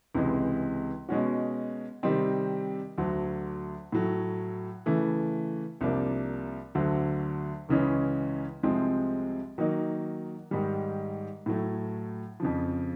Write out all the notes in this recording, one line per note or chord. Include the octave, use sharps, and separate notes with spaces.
C#2 C3 E3 G#3
B2 G#3 C#4 F#4
C3 D#3 G3 C4 D#4
D2 D3 F#3
A2 F#3 A3
C#3 E3 A3
C2 C3 F3 A#3 D4
D2 D3 F#3
C#2 C#3 E3 G#3 C#4
C2 C3 F3 G#3 C4
D#3 F#3 A#3 D#4
G#2 D#3 G3
A2 F#3 A3
F2 C#3 F3